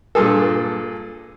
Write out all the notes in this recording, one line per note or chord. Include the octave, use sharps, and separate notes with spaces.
G2 A#2 G#4 A4